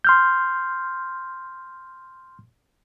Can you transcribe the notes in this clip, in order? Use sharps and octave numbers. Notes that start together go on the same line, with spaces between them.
C6 F6 G6